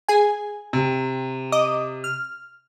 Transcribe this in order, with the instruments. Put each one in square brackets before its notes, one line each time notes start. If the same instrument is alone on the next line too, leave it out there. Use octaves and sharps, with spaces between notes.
[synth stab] G#4 G#5
[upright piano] C3
[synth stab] D#5 D6 D#6
F6